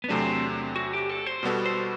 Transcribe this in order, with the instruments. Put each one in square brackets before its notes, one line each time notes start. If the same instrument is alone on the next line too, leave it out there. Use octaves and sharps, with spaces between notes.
[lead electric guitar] B3
[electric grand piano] E2 C3 F#3 A3 D4 [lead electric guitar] C4
[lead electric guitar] F#4
G4
A4
C5
[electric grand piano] B2 G3 B3 F#4 A4
[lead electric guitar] C5